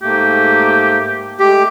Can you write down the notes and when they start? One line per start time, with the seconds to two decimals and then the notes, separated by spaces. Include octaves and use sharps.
0.03 G#2 A3 A#3 G4
1.39 G#3 A3 G4